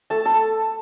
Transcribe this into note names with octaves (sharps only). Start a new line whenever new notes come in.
A3 A4 A5
A4 A5